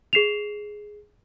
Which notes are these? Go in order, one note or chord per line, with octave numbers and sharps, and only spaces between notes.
G#4 C7 E7 F7